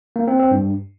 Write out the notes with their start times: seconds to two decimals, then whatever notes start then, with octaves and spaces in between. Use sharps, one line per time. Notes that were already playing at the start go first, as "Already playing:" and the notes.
0.16 A#3
0.28 C4
0.39 C4
0.51 G2